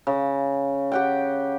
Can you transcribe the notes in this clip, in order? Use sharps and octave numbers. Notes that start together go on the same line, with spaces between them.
C#3
G4 F#5 G5